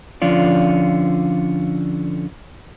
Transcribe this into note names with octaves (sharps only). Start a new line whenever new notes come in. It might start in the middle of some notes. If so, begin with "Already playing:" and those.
D3 F3 C#4 F4 D5